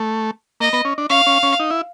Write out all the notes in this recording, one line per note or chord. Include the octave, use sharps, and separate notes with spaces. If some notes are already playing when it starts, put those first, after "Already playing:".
Already playing: A3
A#3 D#5
B3
C#4
D4
C#4 F5
C#4
C#4
D#4
E4